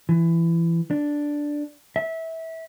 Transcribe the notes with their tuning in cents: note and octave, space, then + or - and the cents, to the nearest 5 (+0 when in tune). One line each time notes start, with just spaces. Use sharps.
E3 +20
D4 +0
E5 -20